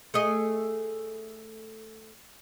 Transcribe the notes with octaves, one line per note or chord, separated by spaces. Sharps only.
A3 G#4 D#5